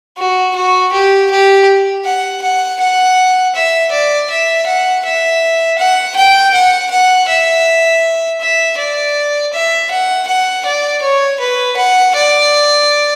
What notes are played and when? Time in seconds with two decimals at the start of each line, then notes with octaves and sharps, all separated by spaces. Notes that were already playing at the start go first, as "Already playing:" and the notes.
0.18 F#4
0.56 F#4
0.93 G4
1.31 G4
2.05 F#5
2.42 F#5
2.80 F#5
3.55 E5
3.92 D5
4.30 E5
4.67 F#5
5.05 E5
5.78 F#5
6.16 G5
6.54 F#5
6.91 F#5
7.28 E5
8.41 E5
8.78 D5
9.53 E5
9.91 F#5
10.27 F#5
10.65 D5
11.02 C#5
11.40 B4
11.77 F#5
12.15 D5